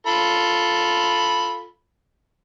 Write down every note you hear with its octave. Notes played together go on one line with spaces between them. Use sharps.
F4 A4 B5